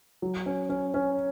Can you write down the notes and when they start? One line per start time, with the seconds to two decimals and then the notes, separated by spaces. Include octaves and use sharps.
0.22 F#3
0.46 C#4
0.69 C#4
0.94 C#4